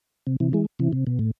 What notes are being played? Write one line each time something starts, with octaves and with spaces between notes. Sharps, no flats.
C3
C3 E3
E3 G#3
C3 E3
C3
B2
A2